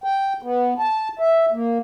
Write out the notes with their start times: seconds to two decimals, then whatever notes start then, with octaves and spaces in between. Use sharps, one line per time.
0.04 G5
0.42 B3
0.79 A5
1.19 E5
1.52 A#3